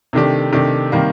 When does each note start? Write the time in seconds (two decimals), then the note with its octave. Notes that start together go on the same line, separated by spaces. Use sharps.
0.13 C3 D#3 A3 D4 G4
0.53 C3 D#3 A3 D4 G4
0.92 C3 D#3 G3 A#3